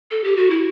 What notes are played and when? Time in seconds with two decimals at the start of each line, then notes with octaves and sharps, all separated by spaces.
0.11 A4
0.24 G4
0.37 F#4
0.50 E4